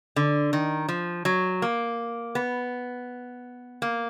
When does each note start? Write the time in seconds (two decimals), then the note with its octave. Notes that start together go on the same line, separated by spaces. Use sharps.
0.16 D3
0.53 D#3
0.88 F3
1.25 F#3
1.62 A#3
2.35 B3
3.82 A#3